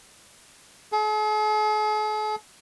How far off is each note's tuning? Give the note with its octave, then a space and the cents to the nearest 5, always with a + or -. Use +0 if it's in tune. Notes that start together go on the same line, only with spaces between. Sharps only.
G#4 +45